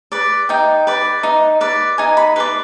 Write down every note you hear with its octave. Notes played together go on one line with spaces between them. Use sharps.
B4 D5
D#4 G5
B4 D5
D#4
B4 D5
D#4 G#5
B5
B4 D5 C6